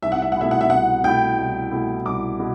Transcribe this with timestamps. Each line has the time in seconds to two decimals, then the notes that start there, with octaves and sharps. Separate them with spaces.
0.03 C2 E5
0.12 F#5
0.22 E5
0.32 F#5
0.37 B2 A3 E4 E5
0.51 F#5
0.61 E5
0.70 C2 F#5
1.04 B2 A3 E4 G5
1.38 C2
1.71 B2 A3 E4
2.05 C2 D6
2.39 B2 E4